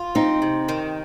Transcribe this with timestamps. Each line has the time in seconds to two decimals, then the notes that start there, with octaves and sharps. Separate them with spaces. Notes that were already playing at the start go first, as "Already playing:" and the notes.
Already playing: F4
0.15 C4 D#4
0.42 C3
0.69 D#3